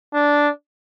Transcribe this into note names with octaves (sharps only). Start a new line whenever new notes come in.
D4